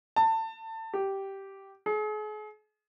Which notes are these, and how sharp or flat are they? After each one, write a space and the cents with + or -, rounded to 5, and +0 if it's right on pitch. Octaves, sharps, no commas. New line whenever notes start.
A5 +25
G4 -10
G#4 +40